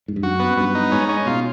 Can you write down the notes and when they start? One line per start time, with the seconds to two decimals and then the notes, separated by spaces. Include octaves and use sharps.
0.08 G#2
0.16 G2
0.23 F#2 F#4
0.40 B3
0.57 G2 B3
0.75 D#4
0.91 G#2 C#4
1.09 C#4
1.26 B2 F4